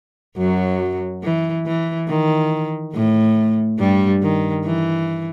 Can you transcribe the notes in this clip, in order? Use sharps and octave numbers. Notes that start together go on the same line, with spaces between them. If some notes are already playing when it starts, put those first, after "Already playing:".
F#2 F#3
E3
E3
D#3
A2 A3
G2 G3
D#3
E3